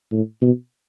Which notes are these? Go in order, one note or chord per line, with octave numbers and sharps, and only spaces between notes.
A2
B2